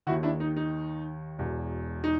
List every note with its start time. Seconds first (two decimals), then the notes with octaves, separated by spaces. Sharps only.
0.07 D#3 E4 F#4
0.10 D#2
0.23 D4 E4
0.40 D#4
0.56 D#4
1.38 E1 E2 B2
2.04 D#4